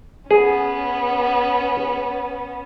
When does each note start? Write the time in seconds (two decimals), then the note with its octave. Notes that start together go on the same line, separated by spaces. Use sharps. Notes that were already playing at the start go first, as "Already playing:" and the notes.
0.31 B3 C#4 G#4